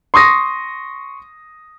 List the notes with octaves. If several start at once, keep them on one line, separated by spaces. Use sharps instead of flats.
C6 C#6 D#6 A#6